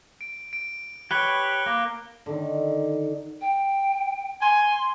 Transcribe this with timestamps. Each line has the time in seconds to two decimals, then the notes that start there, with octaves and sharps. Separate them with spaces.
0.21 D7
0.53 D7
1.11 G4 B4 C#5 F#6 G7
1.66 A#3 D6
2.26 D3 D#3
3.41 G5
4.42 G#5 C6